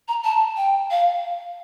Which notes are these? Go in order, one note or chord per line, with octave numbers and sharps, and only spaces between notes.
A#5
A5
G5
F5